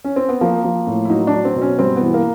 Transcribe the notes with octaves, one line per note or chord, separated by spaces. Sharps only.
C#4
C4
B3
F3 A#3
F3
A2
E4
F#3 D#4
D4
F#3
C4
B2
C#4
G2 C4
B3
E3
A#3